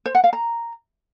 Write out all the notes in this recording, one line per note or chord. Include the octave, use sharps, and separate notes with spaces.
C5
F#5
F5
A#5